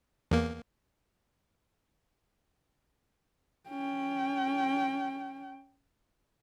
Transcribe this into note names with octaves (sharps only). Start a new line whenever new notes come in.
E2 A#3
C#4 G5